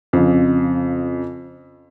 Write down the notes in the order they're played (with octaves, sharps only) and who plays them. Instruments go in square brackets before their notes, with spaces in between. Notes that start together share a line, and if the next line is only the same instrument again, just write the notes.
[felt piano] F2 C#3